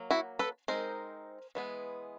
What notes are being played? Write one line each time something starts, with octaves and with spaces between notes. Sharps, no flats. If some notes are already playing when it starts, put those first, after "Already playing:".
Already playing: F#3 A#3
E4 F#4
A4 B4
G#3 C4 D#4 A#4 C5
E3 G#3 B3